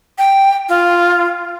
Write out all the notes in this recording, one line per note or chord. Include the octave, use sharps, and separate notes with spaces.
G5
F4